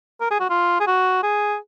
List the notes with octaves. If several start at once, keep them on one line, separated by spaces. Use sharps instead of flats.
A#4
G#4
F#4
F4
G#4
F#4
G#4